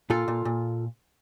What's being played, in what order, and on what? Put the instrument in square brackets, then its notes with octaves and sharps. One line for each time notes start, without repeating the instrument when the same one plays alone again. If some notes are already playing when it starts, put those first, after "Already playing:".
[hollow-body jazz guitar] A#2 F4 A4
A#2
A#2